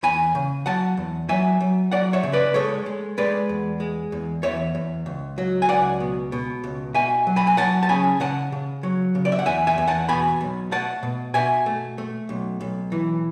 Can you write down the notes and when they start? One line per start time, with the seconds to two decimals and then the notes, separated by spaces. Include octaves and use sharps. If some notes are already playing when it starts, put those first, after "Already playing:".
0.03 E2 G#5 B5
0.35 C#3
0.66 F#3 F#5 A5
0.97 E2
1.29 F#3 E5 G#5
1.61 F#3
1.91 F#3 D5 F#5
2.13 C#5 E5
2.23 C#3
2.33 B4 D5
2.54 G#3 A4 C#5
2.86 G#3
3.18 G#3 B4 D5
3.49 E2
3.80 G#3
4.12 E2
4.43 E2 C#5 E5
4.75 E2
5.06 C#2
5.38 F#3
5.62 G#5
5.69 C#2 D5 F#5
6.00 B2
6.32 B2
6.64 C#2
6.94 B2 E5 G#5
7.27 F#3
7.36 G#5 B5
7.47 G#5
7.57 F#3 F#5 A5
7.83 A5
7.89 C#3 G#5 B5
8.20 C#3 F#5 A5
8.52 C#3
8.83 F#3
9.15 C#3
9.25 D5
9.32 E5
9.39 F#5
9.46 E2 E5 G#5
9.67 E5 G#5
9.78 E2
9.87 F#5 A5
10.09 B2 G#5 B5
10.41 B1
10.72 A3 F#5 A5
11.03 B2
11.34 B2 E5 G#5
11.66 A3
11.98 A3
12.29 B1
12.61 B1
12.92 E3